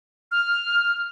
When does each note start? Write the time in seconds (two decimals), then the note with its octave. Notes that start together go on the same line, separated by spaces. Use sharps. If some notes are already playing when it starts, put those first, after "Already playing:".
0.31 F6